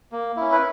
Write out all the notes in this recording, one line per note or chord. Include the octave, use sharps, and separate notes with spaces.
A#3
C#4 E4
B4